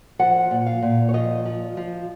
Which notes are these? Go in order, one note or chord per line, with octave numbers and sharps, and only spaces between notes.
F3 F#5
A#2
F5
A#2
C#5
F3 D#5
F3
F3